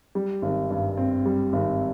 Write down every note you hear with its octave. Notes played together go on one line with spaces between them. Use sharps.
G3
G#1
G2
C4
G3
G#1